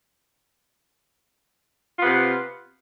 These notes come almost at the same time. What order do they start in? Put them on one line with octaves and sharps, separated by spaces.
F4 B3 C3